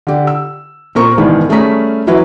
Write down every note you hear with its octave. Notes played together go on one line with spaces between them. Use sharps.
D3 G4
E6
A#2 C4 A#4 C#6
C2 G#2 D#3 E3 B3
G3 A3 C#4 G#4 A#5 B6
E3 F#3 E4 B4